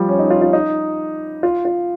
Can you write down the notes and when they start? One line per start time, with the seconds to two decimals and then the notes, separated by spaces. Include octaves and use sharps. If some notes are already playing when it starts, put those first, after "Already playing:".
Already playing: F3 G3
0.09 C#4
0.19 D#4
0.30 F4
0.42 F4
0.53 D#4
1.43 F4
1.65 F4